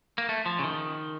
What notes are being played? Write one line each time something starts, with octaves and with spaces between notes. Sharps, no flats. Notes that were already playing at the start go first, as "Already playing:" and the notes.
A#3
A3
F3
C#3
D#3